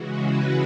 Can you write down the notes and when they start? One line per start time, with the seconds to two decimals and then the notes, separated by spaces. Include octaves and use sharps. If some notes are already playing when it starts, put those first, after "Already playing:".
Already playing: C#3 E3 G#3 F#4
0.17 B4